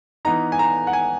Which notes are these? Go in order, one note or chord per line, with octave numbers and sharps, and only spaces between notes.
E3 B3 D#4 A#5
G#5
A#5
F#5
G#5